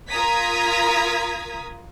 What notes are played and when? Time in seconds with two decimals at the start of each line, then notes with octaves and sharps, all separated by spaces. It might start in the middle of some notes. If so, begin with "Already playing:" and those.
0.11 F4 A#4 A#5 D#6 G#6 B6